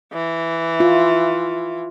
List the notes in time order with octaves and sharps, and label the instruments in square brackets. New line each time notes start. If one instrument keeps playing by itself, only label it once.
[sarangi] E3
[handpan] F4